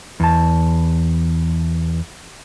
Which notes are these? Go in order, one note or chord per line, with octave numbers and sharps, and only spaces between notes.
E2 A5